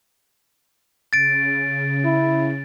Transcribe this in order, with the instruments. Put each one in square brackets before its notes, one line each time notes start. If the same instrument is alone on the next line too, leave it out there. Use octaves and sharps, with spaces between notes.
[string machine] C#3 [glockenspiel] A6 D7
[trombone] E4